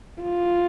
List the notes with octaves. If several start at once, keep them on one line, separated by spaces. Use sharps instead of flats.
F4